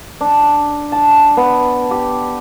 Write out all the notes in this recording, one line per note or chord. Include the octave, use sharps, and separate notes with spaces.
D4
A5
B3
G4